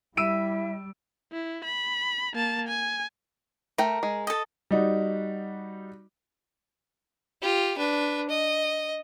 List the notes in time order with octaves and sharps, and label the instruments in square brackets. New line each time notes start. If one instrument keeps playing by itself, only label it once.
[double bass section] G3 [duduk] E4 [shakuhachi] E5 [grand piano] E6 D7 D#7
[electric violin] E4
B5
A#3 A5
G#5
[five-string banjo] A3 G5 [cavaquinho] A#4
[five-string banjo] G#3
[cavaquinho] A4 D#5
[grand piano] G3 D#4 F#4
[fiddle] F4 G4
D4 B4
D#5